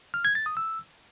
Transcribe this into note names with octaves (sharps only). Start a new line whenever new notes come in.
F6
G#6
A6
D#6
E6